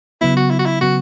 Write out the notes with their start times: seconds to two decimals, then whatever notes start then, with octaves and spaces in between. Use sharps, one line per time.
0.21 C#3 F#3 B3 E4
0.37 F#4
0.51 E4
0.59 F#4
0.66 E4
0.81 C#3 F#3 B3 F#4